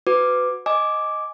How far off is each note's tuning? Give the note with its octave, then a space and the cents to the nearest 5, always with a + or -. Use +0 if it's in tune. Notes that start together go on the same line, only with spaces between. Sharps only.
F#4 -10 B4 +25 D6 +5
D#5 +0 G#5 +5 D6 +0